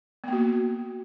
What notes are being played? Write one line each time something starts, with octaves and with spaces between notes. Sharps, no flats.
A#3 B3 F#4